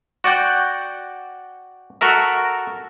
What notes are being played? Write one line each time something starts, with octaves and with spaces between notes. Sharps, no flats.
F#4 D5 F#5 G5
F#4 A4 A#4 E5